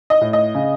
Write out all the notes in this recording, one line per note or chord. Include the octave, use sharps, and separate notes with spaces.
D#5
A2
D#5
C#3